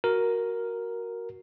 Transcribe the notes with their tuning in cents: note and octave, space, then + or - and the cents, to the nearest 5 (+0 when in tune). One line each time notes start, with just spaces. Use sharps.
F#4 +0 A#4 +0